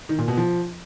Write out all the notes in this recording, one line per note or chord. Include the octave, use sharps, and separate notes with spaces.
D#3
A#2
B2
F3